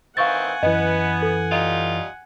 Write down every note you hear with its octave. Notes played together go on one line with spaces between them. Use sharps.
D#3 E3 C4 F5 F#5 G#5 C#6 A6
F#2 E3 B3 D#5
A4
G3 D#4 F4